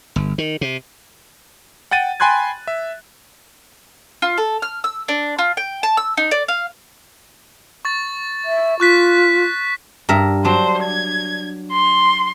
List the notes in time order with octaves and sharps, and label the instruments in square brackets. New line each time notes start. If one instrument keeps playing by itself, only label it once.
[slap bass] G1
D#3
C3
[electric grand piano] F#5 G5 A6 D#7
G5 G#5 B5 C6 F#6 G#6
E5
[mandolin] F4
A4
F6
E6
D4
F4
G5
A5
E6
D#4
D5
F5
[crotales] C#6 A6
[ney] E5
[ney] F4 [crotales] C#6 F#6 B6
[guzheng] G2 A#4 E5
[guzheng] F#3 D4 [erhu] C5
[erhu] G#6
C6